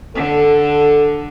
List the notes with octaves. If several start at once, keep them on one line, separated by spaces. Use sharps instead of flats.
D3 A4